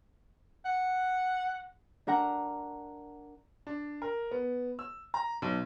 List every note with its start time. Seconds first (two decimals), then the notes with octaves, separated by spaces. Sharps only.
0.65 F#5
2.07 D4 A#4 F#5 A#5
3.67 D4
4.02 A#4
4.31 B3
4.79 E6
5.14 A#5
5.42 B1